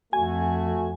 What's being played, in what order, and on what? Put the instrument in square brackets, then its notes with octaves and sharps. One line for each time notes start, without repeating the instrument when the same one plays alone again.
[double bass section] F2 [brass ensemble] A3 F#4 [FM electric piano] G#5